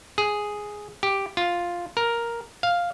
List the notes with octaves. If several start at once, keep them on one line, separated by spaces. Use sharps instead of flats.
G#4
G4
F4
A#4
F5